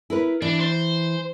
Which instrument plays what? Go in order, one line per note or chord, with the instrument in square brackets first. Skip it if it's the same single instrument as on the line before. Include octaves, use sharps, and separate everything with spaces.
[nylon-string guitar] E4 A#4 B4
[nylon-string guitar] E3 [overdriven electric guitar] D4
[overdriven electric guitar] C5